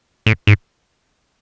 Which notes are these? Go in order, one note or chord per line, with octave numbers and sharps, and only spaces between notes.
A2
G#2